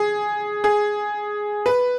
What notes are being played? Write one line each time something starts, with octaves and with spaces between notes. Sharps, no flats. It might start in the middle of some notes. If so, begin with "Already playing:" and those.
Already playing: G#4
G#4
B4